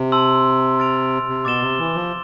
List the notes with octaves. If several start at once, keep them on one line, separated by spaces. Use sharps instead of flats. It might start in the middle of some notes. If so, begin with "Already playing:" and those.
Already playing: C3
A5 C6 E6
F6 A6 D7 F7
C3
B2 D6 A6 E7 G7
C3
E3
F3